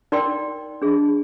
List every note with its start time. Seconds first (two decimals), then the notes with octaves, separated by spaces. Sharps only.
0.12 D#4 A#4 D5 G5 C6
0.82 D4 G#4 D#5